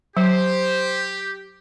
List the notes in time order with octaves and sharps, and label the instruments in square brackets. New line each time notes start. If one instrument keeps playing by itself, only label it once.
[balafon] F#3 [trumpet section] G4 [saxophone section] C5